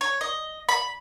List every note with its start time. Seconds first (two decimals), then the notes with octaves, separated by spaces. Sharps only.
0.01 C#5
0.21 D#5
0.69 B5